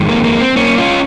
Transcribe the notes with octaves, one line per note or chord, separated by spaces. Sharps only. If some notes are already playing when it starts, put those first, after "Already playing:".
Already playing: F2 D#3 G#3
A#3
A#3
C4
A#3 C#4
C#4 F4